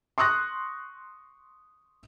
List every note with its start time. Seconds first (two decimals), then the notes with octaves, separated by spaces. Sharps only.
0.18 C6 C#6 D#6 F#6 A#6